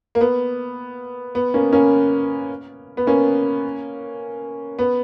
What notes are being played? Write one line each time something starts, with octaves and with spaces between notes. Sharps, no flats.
A#3
B3
B3
A#3 C#4
A#3 C#4
B3
A#3 C#4
B3